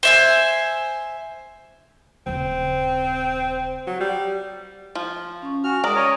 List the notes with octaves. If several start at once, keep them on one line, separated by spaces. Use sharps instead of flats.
C5 E5 G#5
D#1 C#3 C4
F#3
G3
F3
C#4 C#6
F#4 G#5 F6
G#3 A#4 D5 D#6
C#5 D#5